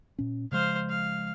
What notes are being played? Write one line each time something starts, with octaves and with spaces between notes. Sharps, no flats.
A#2 C#4
C#3 F3 G#3 C5 F5
F5